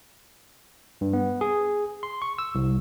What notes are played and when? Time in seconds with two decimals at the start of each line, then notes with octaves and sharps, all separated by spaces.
1.01 G2
1.13 B3
1.41 G#4
2.03 C6
2.22 C#6
2.39 E6
2.55 C2